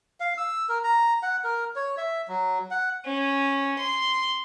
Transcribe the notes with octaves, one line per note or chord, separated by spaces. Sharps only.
F5
E6
A#4
A#5
F#5
A#4
C#5
E5
F#3
F#5
C#4
C6